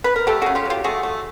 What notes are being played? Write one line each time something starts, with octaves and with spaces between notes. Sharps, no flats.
B4
A#4
A3 G4 A4
C#3 F#4 G#4
F4 G4
F#3 F4 G4
A3 F#4 G#4
A3